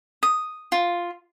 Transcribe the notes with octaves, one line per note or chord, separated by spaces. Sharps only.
D#6
F4